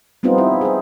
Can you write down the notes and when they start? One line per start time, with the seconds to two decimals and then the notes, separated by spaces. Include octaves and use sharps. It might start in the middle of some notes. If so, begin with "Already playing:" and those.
0.23 G3 B3 C4 D#4 F4
0.38 E4
0.61 G#4 C5